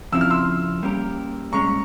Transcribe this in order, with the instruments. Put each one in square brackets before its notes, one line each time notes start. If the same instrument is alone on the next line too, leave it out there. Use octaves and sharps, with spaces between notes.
[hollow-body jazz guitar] F2 C#3 F3 C4 E4 [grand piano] E6
[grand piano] F6
C6 E6
[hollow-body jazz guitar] G3 A#3 C#4 G4 A#4
[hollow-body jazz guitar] A#2 G#3 C#4 [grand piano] A#5 C#6